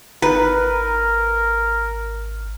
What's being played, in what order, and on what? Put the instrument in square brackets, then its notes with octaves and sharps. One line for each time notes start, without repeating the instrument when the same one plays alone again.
[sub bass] G#1 [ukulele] D#4 [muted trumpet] A#4 [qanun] B4